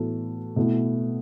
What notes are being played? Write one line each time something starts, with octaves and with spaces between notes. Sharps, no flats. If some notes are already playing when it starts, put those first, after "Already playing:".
Already playing: A2 E3 B3 F#4 A4
B2 A3 E4